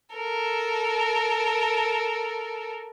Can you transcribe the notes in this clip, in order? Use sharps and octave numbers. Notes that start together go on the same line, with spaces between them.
A4 A#4